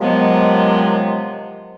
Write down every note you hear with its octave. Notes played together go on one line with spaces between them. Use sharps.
C3 D#3 F3 F#3 G#3 B3